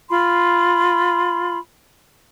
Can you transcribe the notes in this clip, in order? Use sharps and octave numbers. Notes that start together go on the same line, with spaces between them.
F4 B5 C6